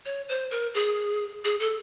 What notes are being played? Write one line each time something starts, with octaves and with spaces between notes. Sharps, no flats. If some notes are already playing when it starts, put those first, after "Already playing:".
C#5
C5
A#4
G#4
G#4
A4